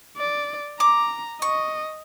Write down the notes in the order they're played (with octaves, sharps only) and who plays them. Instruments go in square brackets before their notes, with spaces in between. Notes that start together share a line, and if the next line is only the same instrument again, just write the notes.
[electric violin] D5
[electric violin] A#5 [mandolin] D6
[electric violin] D#5 [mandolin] C#6